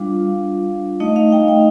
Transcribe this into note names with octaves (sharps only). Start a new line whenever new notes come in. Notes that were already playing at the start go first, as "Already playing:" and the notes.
Already playing: G3 D4 F4 F5
A3 D#4 D#5
F5
G5
G5